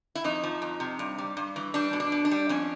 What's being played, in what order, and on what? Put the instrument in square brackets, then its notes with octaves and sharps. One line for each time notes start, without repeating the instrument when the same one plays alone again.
[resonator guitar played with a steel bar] E4
F2 D#4
F3
F2
C3
G2
G3
G2
E3
G3 D4
B2
D4
B2
D4
G3
F2 C#4